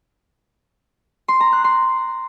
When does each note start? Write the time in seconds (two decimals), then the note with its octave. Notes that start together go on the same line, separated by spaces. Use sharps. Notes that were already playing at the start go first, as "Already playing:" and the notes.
1.28 C6
1.40 A#5
1.52 F#6
1.64 C6